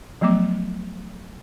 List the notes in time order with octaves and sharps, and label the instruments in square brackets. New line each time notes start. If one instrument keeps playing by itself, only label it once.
[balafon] F3 F#3 A3 B3 D6